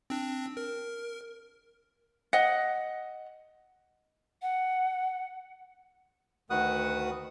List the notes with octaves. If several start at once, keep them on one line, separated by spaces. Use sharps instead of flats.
C4 D4
A#4
D#5 F#5
F#5
D2 D#3 F#4 B4 F#5 D#6